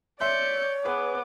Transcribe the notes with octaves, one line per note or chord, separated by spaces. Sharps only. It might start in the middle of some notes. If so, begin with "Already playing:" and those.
C#5 D5 E5 C6 G6 C#7
B3 G#4 B4 D6